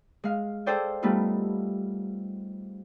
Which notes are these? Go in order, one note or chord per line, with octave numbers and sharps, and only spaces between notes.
G#3 F5
G#4 A4 C5 D5 G5 G#5
G3 A3 B3 D#4 F4